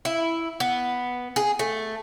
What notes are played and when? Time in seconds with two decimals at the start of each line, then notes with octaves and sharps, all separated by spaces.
0.05 E4
0.60 B3
1.36 G#4
1.59 A3